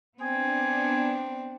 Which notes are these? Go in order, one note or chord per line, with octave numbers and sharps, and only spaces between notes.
B3 C4 D4 G#5